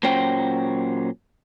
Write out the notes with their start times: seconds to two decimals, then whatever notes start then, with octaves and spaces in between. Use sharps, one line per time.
0.03 A#2 F#3 C#4 C5 G5